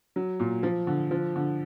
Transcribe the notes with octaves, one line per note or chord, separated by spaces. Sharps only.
F#3
A#2
F3
D3
F3
D3